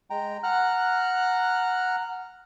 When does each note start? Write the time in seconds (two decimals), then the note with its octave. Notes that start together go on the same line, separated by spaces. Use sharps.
0.10 G#3 G5 A#5
0.43 F#5 A#5 F6 F#6